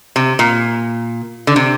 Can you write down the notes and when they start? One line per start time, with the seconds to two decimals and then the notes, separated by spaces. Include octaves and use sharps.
0.16 C3
0.39 A#2
1.47 D3
1.56 C3